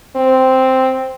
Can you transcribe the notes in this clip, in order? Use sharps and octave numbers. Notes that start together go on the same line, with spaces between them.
C4